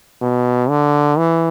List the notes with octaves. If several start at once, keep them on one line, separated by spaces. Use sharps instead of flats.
B2
D3
E3